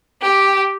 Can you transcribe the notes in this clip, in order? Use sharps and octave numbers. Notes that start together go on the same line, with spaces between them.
G4